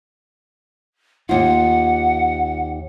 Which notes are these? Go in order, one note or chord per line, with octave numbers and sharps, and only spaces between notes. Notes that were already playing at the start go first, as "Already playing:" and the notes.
D#2 F4 F#5